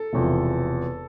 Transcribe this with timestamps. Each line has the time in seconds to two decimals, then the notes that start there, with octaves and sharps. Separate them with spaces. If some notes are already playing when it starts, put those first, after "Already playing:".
Already playing: A4
0.13 E1 E2 C3 F3